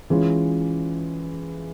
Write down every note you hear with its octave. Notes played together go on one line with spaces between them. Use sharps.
E3 G#3 C#4 F4